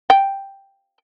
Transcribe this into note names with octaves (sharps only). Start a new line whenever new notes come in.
G5